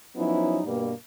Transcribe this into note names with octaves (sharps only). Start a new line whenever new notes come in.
F3 F#3 B3 C#4 D#4 E4
G2 B2 G3 A#3